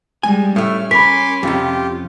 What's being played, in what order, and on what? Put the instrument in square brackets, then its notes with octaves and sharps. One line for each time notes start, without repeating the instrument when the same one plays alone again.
[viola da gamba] G3 G#3 [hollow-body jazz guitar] G#5
[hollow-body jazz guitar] A2 A3 [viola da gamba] C#4 [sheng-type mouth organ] F6
[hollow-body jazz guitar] A#4 [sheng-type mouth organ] G#5 C6 D6 [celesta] B5 B6
[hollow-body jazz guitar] F2 C3 [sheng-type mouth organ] F4 G4